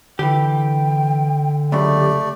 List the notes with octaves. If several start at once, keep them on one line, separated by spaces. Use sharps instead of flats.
D3 E3 G4 G5
C#2 F#2 C#3 A3 G4 D5